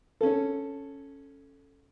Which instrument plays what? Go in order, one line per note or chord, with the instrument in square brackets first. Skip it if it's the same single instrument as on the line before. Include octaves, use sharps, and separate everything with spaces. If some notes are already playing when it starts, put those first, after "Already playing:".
[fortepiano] C#4 A4